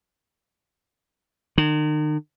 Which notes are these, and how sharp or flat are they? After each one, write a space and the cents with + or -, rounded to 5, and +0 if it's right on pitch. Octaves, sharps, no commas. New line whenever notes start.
D#3 -40